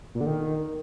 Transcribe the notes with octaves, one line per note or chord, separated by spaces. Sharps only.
A#2
D3
D#3